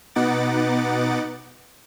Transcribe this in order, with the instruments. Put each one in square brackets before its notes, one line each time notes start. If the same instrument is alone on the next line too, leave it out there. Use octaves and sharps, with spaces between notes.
[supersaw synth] B2 B3 D#4 F#5 D6 A6